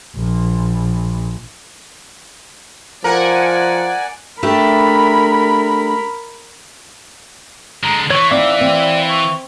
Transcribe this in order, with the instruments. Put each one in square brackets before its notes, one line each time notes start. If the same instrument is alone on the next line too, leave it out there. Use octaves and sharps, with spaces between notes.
[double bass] A#1
[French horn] F3 [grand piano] A#4 [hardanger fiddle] D5 [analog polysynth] F#5 G#5
[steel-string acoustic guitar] A3 D4 G4 [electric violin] A#4 B5
[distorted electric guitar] D3 G#3 [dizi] A#5
[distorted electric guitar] E3 [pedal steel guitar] C#5 [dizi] C#6
[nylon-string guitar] C4 D#4 [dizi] D5 [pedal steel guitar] E5 F5 D6
[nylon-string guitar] C4
[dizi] C#6